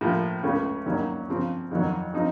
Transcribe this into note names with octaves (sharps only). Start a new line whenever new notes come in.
A2 F3 A#3
C#2 C#3 A3 C#4
D#2 D#3 F#3 A#3 C#4
C#3 F3 C4
F2 D#3 F#3
F3 C4 D#4